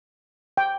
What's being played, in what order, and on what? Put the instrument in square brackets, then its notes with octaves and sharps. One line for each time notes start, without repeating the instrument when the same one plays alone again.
[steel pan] G5